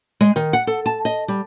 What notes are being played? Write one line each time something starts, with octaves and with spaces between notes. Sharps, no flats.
G#3
D#3
F#5
A4
A5
D#5
G3